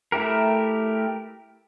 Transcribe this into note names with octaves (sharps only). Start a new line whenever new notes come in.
A3 E4 G4 A#4